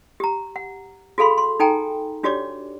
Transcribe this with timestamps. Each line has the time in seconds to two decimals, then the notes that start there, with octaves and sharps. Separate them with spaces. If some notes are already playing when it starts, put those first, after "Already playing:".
0.20 G4 A#5
0.56 F#5
1.18 F#4 G#4 A4 F5 B5 C6
1.38 C6
1.60 D#4 A4 G5 G#5 A#5
2.23 D4 F#4 G4 C#5 D5 D6